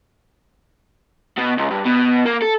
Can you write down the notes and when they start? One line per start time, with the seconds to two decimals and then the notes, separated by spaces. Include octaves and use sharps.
1.38 B2
1.58 C#2
1.71 G2
1.85 B2
2.25 A#3
2.42 A4